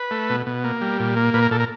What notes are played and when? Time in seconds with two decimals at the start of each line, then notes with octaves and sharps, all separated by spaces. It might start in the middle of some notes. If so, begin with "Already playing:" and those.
Already playing: B4
0.11 A3
0.30 B2
0.46 B2
0.64 A#3
0.81 G3
1.00 A#2
1.16 A#3
1.34 A#2 B4
1.42 A#4
1.51 A#2 A4
1.60 A#4